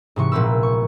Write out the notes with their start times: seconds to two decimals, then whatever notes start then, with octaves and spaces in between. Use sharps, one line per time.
0.16 G#2 C3 E3 C#6
0.32 A#1 A#2 B3 C4 B4 E6
0.63 C#6